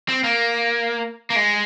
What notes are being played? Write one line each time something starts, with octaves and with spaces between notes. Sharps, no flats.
C4
A#3
A#3
G#3